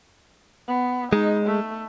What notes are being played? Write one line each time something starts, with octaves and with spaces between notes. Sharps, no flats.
B3
G#3 D#4
A3